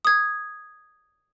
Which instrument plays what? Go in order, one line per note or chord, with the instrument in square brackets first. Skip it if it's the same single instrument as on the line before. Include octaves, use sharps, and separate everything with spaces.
[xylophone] D#6 G#6